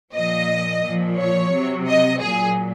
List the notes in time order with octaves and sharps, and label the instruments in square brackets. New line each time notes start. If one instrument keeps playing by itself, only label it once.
[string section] A#2 F3 D#5
A#2 F3
C#5
C3 F#3
D#5
A#2 F#3 G#4